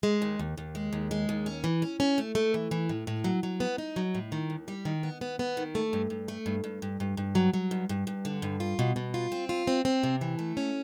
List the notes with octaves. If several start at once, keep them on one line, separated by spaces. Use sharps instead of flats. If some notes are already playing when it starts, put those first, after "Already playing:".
G#3
D#2
D#2
D#2
G#3
D#2
G#3
D#2
C#4
E3
C#4
C#4
A3
A3
E3
E3
A2
A2
F#3
F#3
B3
D#4
F#3
A2
D#3
D#2
G3
D#3
B3
B3
B3
D#3
A3
G2
G2
A3
G2
G2
G2
G2
G2
F#3
F#3
G2
G2
G2
D3
G2
F4
B2
B2
F4
C4
F4
C4
C4
C3
E3
A3
C#4